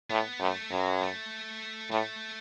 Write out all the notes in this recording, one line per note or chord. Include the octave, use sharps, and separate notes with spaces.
A2 B3
F#2 A3
F#2 F#3
A3
A2 A3